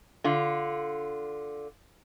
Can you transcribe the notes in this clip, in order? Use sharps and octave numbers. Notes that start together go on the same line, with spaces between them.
D3 F4